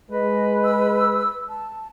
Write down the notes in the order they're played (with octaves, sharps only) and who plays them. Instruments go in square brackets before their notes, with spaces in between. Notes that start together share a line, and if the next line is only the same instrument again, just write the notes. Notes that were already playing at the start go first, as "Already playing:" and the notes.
[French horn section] G#3 [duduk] B4 [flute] D#5
[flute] E6
A5